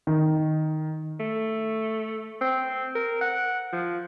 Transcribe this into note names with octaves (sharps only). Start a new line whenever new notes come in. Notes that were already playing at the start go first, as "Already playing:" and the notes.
D#3
A3
C4
A#4
F#5
F3